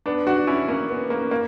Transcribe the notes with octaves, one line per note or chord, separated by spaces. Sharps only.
B3 D4
D4 F#4
C#4 E4
A#3 C#4
B3
A#3
A#3